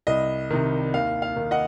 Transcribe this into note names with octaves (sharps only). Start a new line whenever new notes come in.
C2 D#5
C3 D#3
D#2 F5
F5
D#3
D#5 F#5